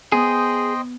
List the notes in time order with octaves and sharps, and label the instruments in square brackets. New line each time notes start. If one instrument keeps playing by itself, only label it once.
[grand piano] B3 [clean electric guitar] G#4 [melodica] C5 D#5 G5